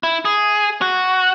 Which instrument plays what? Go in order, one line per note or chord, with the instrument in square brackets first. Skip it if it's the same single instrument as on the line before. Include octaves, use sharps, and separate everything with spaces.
[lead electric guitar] E4
G#4
F#4